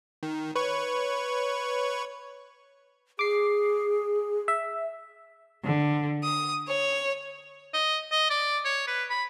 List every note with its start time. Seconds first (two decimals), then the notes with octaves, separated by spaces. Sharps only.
0.23 D#3
0.56 B4 C#5 C#6
3.19 G#4 D6 C7
4.48 E5
5.65 D3
6.24 D#6
6.68 C#5
7.74 D#5
8.12 D#5
8.30 D5
8.65 C#5
8.87 B4
9.10 B5